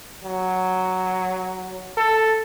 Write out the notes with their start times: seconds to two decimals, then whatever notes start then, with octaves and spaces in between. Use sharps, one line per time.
0.24 F#3
1.97 A4